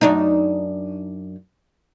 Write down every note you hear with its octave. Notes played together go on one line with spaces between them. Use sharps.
F#2 D4 D#4